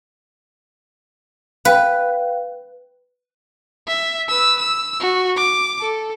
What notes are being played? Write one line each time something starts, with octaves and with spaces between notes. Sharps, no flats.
B4 F5 G5
E5
B4 E6
E6
F#4
D6
A4